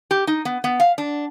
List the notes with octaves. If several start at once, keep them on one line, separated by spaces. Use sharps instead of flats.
G4
D#4
B3
B3
F5
D4